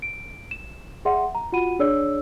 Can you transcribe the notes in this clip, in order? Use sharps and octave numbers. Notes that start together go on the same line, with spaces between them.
D7
E7
G#4 D5 E5 F#5 C6
A#5
F4 F#4 F#5 B5 D#7
D4 G#4 C#5 D5 E6